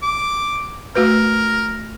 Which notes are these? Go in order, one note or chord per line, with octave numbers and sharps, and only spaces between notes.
D6
A3 F#4 A#4 B4